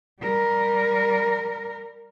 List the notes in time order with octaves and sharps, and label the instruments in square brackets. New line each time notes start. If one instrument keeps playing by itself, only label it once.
[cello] G3 A#4